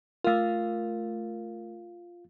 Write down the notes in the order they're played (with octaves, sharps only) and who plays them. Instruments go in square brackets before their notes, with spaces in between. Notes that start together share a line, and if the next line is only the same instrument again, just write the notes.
[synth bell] A3 A#4 [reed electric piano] F4 F5